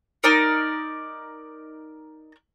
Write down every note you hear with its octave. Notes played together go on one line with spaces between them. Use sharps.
D#4 A#4 D5